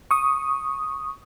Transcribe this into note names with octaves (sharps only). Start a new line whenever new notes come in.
C#6 D#6